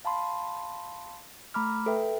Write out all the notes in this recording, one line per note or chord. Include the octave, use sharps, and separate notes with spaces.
F5 A5 B5 C6
A3 A#5 B5 D6 F6
A4 B4 E5 G5